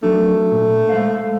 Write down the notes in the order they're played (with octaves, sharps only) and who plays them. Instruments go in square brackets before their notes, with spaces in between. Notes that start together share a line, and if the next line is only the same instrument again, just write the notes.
[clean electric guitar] F#3 D4 [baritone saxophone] A3
[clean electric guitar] A#2
G#3 C5 F5